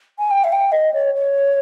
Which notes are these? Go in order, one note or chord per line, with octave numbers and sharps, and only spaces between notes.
G#5
G5
E5
G5
D#5
C#5
C#5